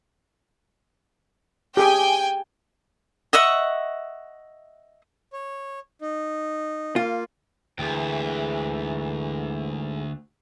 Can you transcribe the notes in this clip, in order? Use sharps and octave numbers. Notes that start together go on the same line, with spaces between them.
G4 G#4 G5 G#5
D#5 E5 F#5 C#6
C#5
D#4
A#3 F4
D2 G#2 E3 G#4 G5